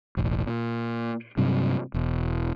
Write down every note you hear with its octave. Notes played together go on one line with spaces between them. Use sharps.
E1 A1
A#2
G2 C3 F#3
E1